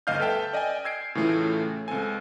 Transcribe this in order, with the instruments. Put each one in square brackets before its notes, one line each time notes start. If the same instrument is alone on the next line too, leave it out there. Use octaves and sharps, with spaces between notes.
[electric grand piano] G1 D2 D#5 F5 F6 G6
A4 B4 E5 G5 A5
D5 D#5 G5 G#5
E6 G#6 C7 D7
A2 C#3 E3 A3 F4
C#2 C4 A4 G#5